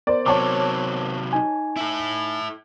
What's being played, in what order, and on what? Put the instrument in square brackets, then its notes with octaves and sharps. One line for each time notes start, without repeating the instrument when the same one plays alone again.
[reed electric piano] B3 A#4 C5 [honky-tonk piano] D5
[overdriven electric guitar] C3 F#3 [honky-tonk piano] C#5 A5 D6
[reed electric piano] D#4 G#5
[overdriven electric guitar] E4 A4